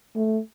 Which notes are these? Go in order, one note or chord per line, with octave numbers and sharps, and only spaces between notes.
A3